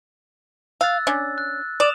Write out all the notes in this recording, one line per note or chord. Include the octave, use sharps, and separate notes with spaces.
F5 E6 F#6 A6
C#4 D4
F#6
D5 D#6 E7 F7